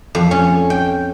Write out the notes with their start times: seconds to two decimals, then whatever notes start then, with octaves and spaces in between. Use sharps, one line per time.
0.15 F2
0.31 C#4
0.70 G5